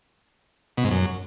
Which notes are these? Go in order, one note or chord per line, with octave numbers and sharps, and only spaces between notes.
B2
G#2
F#2